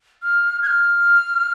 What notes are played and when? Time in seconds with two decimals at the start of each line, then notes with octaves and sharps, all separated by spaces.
0.23 F6
0.62 G#6
0.67 F6